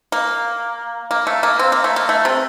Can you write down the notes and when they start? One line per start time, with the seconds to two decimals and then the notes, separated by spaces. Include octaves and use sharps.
0.12 A#3
1.11 A#3
1.27 A3
1.43 A#3
1.59 C4
1.72 A#3
1.84 A3
1.96 A#3
2.09 A3
2.25 C3